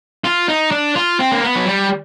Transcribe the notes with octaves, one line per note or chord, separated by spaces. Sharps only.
F4
D#4
D4
F4
C4
A#3
B3
F#3
G3